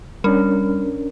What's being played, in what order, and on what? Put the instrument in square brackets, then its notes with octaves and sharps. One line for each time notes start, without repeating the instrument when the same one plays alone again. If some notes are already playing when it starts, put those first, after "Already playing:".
[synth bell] G3 [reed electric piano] C#4 D4 A#4